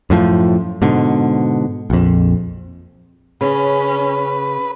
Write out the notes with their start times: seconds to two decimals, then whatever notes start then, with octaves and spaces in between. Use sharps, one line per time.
0.10 F#2 A2 F3
0.82 G#2 B2 D3
1.90 A#1 F2
3.41 C#3 C#4 B4